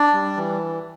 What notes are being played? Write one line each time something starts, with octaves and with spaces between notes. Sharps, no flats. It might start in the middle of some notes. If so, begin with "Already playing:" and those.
Already playing: D4 D5
G3
E3